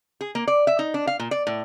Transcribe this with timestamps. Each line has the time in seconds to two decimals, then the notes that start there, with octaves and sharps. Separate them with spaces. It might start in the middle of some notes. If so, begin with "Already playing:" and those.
0.21 G#4
0.35 A#3
0.48 D5
0.67 E5
0.79 D#4
0.94 D4
1.07 F5
1.19 A#2
1.31 D5
1.47 A2